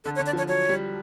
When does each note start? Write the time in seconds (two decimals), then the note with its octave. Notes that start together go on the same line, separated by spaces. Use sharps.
0.04 D3 A4
0.16 C#5
0.19 D3
0.26 D5
0.33 F3 C#5
0.48 F#3 C#5
0.69 G3